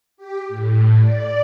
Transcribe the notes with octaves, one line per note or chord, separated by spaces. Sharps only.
G4
A2
D5